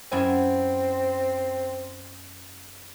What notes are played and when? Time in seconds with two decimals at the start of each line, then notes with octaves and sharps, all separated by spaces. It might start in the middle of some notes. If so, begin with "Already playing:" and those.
0.12 F#2 C4 E4 G#5